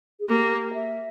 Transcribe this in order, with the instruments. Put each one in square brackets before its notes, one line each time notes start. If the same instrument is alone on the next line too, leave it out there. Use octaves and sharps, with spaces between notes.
[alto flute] G#4
[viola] A#3 [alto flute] G4
[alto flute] E5